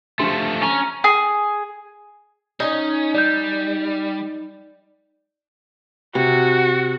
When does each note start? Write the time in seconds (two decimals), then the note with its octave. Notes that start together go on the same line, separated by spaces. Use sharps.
0.19 F3 A3 D4 G4 C6
0.62 C#4 A#5
1.04 G#4
2.60 C#4 D#4 G#5
3.15 G3 D5 G6
6.15 C3 F#4